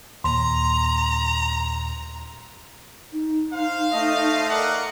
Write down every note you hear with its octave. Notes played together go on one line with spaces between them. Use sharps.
D#2 A#2 A#5 C6
D#4
C5 F5
A3 D#5
A#4 D5 F#5